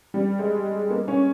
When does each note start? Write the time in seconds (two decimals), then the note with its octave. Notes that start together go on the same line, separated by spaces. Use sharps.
0.14 G3
0.39 G#3
0.90 A#3
1.08 C#4